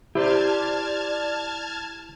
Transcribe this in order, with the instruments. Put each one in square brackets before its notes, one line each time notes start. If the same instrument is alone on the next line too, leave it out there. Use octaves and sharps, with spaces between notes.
[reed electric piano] E4 [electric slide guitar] G4 C5 [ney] D5 [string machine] A5 F6 G#6